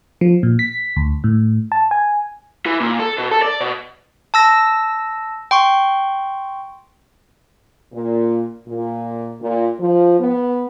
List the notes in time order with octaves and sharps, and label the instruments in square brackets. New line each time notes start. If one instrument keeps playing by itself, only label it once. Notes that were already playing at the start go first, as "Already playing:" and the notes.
[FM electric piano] F3
A#2
B6
D2
A2
A5
G#5
[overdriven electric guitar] E3
A#2
A4
B2
A4
D5
B2
[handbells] A5 E6 A#6
G5 C6 C#6
[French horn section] A#2
A#2
A#2
F3
B3